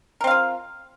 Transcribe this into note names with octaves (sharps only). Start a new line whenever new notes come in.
C4 F4 A#4 F5